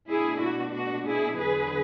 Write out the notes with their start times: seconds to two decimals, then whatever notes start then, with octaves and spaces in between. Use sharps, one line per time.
0.10 B2 A3 D4 E4 G#4
0.43 F#4
0.75 F#4
1.07 E4 G#4
1.39 E2 D3 F#3 G#4 B4